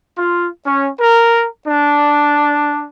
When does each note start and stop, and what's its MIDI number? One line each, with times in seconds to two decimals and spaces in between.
0.16 0.47 65
0.65 0.88 61
0.99 1.44 70
1.65 2.84 62